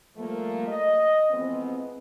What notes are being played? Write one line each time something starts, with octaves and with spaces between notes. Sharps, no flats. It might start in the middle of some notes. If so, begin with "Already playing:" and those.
F3 G3 A3 A#3
D#5
F2 E3 G#3 B3 C4